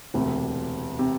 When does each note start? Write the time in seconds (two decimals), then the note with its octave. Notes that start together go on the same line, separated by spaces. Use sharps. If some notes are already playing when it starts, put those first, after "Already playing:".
0.14 E1 D2 C3
0.99 C3